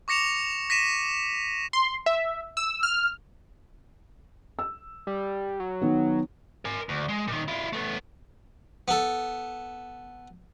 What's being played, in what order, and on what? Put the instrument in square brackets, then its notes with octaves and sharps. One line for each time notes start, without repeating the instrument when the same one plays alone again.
[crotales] C#6 D6 A#6 C#7 E7 F7
A#6 B6 D#7 E7
[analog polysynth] C6
E5
E6
F6
[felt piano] E6
[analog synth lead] G3
F#3
[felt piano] D#3 B3
[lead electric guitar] A#4 G#5
D2
G#3
A#2 D#3
E4 F4
A3 B3
[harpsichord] B3 A4